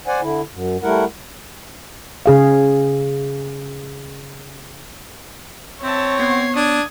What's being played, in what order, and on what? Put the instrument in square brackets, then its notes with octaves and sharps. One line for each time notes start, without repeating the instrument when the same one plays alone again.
[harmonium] C5 D5 F#5 G#5
D3 E4
F#2
G3 A3 E4 A#4 F#5
[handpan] C#3 G#4 F5
[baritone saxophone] C4 [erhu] C#5 [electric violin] E5 A5
[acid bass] B3 [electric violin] G#6 C7
[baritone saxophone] D4 [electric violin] D#6 G#6